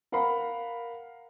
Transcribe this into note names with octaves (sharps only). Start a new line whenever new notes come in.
A#4 F5 F#5 A#5 B5